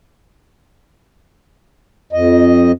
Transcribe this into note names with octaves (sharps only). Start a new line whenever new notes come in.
F2 D#5